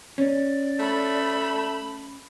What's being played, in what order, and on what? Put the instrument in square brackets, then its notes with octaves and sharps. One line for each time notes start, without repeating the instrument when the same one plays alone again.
[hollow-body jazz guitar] C#4 [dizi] D5
[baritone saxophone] A3 [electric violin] B5